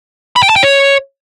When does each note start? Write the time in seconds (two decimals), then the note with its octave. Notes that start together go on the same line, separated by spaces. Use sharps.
0.36 B5
0.43 G5
0.49 A5
0.56 G5
0.63 C#5